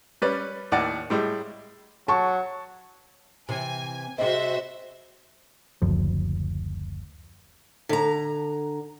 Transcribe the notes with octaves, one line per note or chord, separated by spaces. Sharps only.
G3 C#4 B4 D5
D#2 A2 D5 F#5
A2 G3 G#3
F#3 A5 C#6
C3 E3 C4 G#5
C3 G3 C4 F#4 G#4 C5 D#5 E5
F#1 D2 F3
D3 A#5